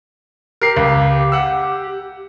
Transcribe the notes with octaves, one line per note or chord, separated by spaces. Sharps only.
G4 A#4 C7
C#2
F#5 E6